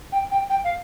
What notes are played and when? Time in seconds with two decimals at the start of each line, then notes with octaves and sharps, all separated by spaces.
0.12 G5
0.31 G5
0.50 G5
0.64 F5